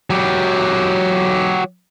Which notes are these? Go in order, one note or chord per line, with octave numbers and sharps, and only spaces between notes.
F#3 G4